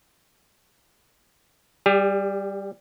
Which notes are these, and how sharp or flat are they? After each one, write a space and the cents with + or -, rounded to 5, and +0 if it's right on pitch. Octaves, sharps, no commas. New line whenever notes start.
G3 +0 G4 +45